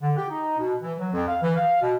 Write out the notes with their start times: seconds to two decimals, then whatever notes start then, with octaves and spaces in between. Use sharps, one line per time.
0.02 D3
0.17 G4
0.30 D#4
0.58 B2
0.82 E3
0.99 F#3
1.13 F2
1.28 F5
1.42 E3
1.56 F5
1.81 B2